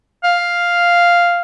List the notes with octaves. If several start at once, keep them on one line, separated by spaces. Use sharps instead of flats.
F5